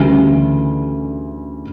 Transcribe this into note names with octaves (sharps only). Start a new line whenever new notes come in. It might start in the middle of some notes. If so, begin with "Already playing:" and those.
Already playing: D2 C#3 E3 G3